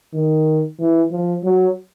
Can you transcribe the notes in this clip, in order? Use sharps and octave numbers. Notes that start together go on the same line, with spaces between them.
D#3
E3
F3
F#3